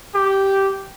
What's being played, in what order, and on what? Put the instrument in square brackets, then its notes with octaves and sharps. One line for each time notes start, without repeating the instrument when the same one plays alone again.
[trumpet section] G4